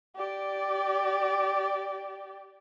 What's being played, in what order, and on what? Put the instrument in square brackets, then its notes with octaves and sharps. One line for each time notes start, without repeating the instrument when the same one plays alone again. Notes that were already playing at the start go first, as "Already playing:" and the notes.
[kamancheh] G4 D5